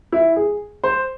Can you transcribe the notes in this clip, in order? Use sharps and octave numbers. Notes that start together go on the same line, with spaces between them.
E4
G#4
C5